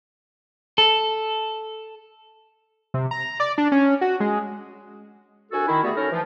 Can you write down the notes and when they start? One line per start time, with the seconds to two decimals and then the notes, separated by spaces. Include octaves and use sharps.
0.78 A4
2.94 C3
3.11 A#5
3.40 D5
3.58 D4
3.72 C#4
4.01 F#4
4.20 G#3
5.51 C2 D4 F#4 A4 G#5
5.67 D#3 E4
5.83 G3 A3 B3 F#4 G#4
5.95 C#4 D#4 A4 A#4
6.11 E3 F3